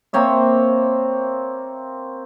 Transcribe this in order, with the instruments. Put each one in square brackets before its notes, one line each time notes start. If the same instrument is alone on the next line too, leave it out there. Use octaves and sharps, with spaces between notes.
[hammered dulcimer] A#3 C4 C#5 E5